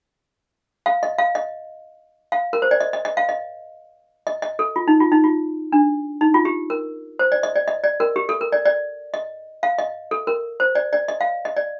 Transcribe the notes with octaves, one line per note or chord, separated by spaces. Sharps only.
F5
D#5
F5
D#5
F5
A#4
C5
D5
D#5
D#5
D#5
F5
D#5
D#5
D#5
A4
F4
D#4
F4
D#4
F4
D4
D#4
F4
G4
A#4
C5
D5
D#5
D5
D#5
D5
A#4
G4
A4
A#4
D5
D5
D#5
F5
D#5
A4
A#4
C5
D5
D5
D#5
F5
D#5
D5